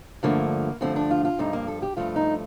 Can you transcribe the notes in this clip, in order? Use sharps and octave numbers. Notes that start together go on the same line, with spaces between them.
G2 D3 F3 A3 A#3
G2 D3 F3 A3 C4
D4
F4
F4
G2 F3 A3 D#4
A#3
A4
G4
G2 F3 A3 F4
D#4